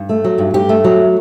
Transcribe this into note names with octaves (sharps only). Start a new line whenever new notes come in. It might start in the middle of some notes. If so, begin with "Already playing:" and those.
Already playing: G2
A3
F#3
G2
G2 G4
A3
F#3